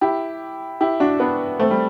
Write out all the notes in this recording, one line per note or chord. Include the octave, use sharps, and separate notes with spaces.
E4 G4
E4 G4
D4 F#4
B3 D4
A3 C4
G3